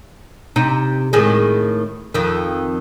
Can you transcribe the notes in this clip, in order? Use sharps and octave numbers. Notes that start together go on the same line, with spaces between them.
C3 D#4
A2 D#3 G#3
F2 D#3